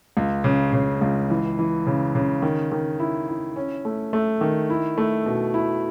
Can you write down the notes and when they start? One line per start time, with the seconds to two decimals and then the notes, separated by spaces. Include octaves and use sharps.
0.17 C#2
0.44 C#3
0.73 C#3
1.01 C#2
1.30 E3
1.59 E3
1.86 C#3
2.15 C#3
2.42 D#3
2.72 D#3
3.00 E4
3.29 E4
3.56 C#4
3.85 A3
4.13 A3
4.41 D#3
4.70 E4
4.98 A3
5.26 B2
5.54 E4